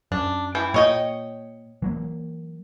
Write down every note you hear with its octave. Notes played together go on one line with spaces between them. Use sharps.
F#2 D4
E3 G5
A#2 C#5 D#5 G5
E3 F#3 A#3